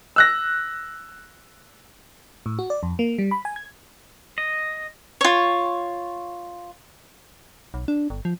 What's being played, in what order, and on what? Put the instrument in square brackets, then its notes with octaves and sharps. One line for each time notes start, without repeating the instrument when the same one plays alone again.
[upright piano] E6 F#6 A#6
[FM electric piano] A2
F#4
D5
F2
A#3
G3
B5
G#5
G#6
[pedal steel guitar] D#5
[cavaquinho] F4 C#5
[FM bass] B1
D4
G1
F3